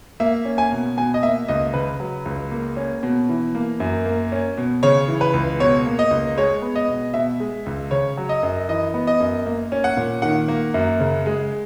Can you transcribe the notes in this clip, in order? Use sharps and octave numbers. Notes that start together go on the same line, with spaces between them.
A#3 E5
C#4
G#5
B2
B2 G#5
D#5
A#3 E5
C#2 D#5
C#3 B4
F#3
C#2
A#3
C#4
B2
E3
A#3
F#2
A#3
C#4
B2
C#3 C#5
E3
B4
C#2
B2 C#5
A#3
D#5
C#2
G#3 C#5
B3
D#5
B2
B2 E5
G#3
C#2
C#3 C#5
F#3
D#5
F#2
E3 D#5
B3
D#5
F#2
A#3
C#4
F#5
A#2
D#3 F#5
A#3
F#2
C#3
G#3